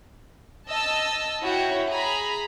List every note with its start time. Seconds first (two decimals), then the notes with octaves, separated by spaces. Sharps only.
0.69 D#5 A5 E6
1.42 E4 F#4 C#5 G5
1.87 G#4 A#5 B5